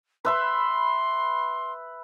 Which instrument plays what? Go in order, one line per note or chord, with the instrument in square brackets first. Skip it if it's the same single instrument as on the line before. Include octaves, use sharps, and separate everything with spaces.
[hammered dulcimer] B4 E5 B5 [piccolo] C6